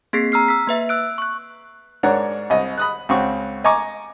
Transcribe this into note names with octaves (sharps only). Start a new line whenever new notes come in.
A#3 C4 G#4 B6 C7
A#5 E6 F6 C7
E6 B6
A#3 B4 E5
E6 F#6 D7
C#6 F#6
G#2 D4 A#4 C#5 F#5
C2 D#5
B5 D#6 F#6
C#2 C4 F#4 C#6
D#5 G#5 A#5 C#6 D6